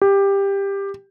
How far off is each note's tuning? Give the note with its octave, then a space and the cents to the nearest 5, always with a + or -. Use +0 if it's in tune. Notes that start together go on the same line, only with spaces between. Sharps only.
G4 +15